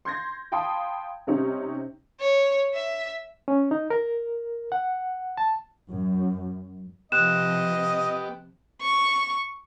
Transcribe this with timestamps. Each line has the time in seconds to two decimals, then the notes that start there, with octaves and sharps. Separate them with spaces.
0.05 C6 G6 G#6 A#6
0.52 F5 G5 A5 B5 C6 D#6
1.27 C3 G3 C4 C#4 D#4
2.20 C#5
2.74 E5
3.48 C#4
3.71 D#4
3.90 A#4
4.72 F#5
5.37 A5
5.88 F#2
7.12 C3 F3 B3 G4 D#5 F#6 E7
8.82 C#6